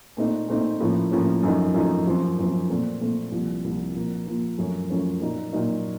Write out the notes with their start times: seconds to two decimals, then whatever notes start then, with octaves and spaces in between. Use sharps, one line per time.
0.17 A#2 A3 C4 D#4
0.48 A#2 A3 C4 D#4
0.81 A2 F3 A#3 C#4
1.11 A2 F3 A#3 C#4
1.43 F#2 F3 A3 D#4
1.74 F#2 F3 A3 D#4
2.06 F#2 F3 C4
2.38 F#2 F3 C4
2.69 A#2 A3 C4
3.00 A#2 A3 C4
3.32 C2 A#2 F3
3.64 C2 A#2 F3
3.95 A#2 F3 A#3
4.26 A#2 F3 A#3
4.58 F#2 F3 A3 C#4
4.90 F#2 F3 A3 C#4
5.21 A#2 F#3 A#3 D#4
5.53 A#2 F#3 A#3 D#4